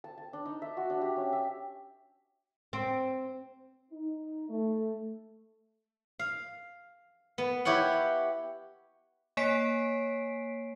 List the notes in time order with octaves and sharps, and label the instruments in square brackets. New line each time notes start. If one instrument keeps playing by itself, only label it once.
[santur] A5
A5
D4
D#4
E5
F#4
D4
G4
C#4
E5
[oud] C4
[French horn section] D#4
A3
[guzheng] F5
B3
E4 G4 C#5 F#5
[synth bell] A#3 C#5 G#5 B6 C7 D7